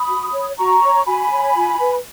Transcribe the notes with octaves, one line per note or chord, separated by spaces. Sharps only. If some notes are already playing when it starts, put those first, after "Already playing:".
Already playing: B5 D#6
F#4
C#5
F#4 A#5 C#6
C#5
F#4 G#5 B5
C#5
F4
B4